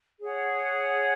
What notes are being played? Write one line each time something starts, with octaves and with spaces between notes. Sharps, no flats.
G#4 C#5 F#5